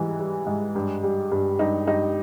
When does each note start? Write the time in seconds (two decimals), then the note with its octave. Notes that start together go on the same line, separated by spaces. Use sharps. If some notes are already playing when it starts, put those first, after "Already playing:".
Already playing: G#2 E3 G3
0.20 G3
0.47 G#2
0.75 G2
1.04 G3
1.32 G2
1.59 G2 D#4
1.87 G2 D#4